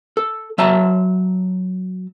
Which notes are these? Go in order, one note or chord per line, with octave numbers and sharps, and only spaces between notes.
A4
F#3 E5 A5 A#5